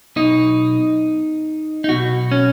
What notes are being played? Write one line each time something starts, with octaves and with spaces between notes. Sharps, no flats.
B1 B2 D#4
D#4
B1 B2 F#4
C#4